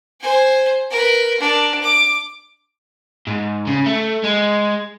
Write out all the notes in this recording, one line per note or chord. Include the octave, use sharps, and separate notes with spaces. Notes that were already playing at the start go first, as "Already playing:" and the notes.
C5 G#5
A#4 B4
D4 A#4
D6
G#2
C#3
A3
G#3